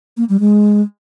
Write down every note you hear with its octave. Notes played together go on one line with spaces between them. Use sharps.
A#3
G3
G#3